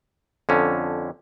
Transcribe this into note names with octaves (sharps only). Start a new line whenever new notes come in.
F2 D3 C#4